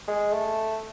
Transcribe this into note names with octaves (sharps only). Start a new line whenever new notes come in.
G#3
A3